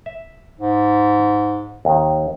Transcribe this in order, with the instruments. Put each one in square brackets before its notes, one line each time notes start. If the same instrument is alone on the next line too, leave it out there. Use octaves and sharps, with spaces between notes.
[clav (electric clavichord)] E5
[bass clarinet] G#2
[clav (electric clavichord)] D#2 D#3